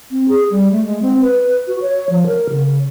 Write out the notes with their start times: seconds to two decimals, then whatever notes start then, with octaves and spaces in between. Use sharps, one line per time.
0.11 C4
0.29 G#4
0.51 G3
0.72 A3
0.85 G#3
1.02 C4
1.22 B4
1.67 F#4
1.82 C#5
2.10 F3
2.27 A#4
2.50 C#3